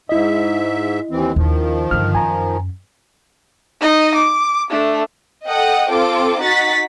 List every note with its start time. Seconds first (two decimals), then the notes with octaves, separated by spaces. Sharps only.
0.09 G#2 E4 D#5 E5
1.11 D#2 E3 C4
1.36 D#2 D#3 F3 C#4
1.91 G2 D3 F6
2.15 F#2 G#5 A#5
3.81 D#4 D#5
4.15 D6
4.70 A3 D4
5.47 A4 D#5 F#5 G5 D#6
5.90 C4 F4 A4 D6
6.42 D#4 F#4 F#5 A6 B6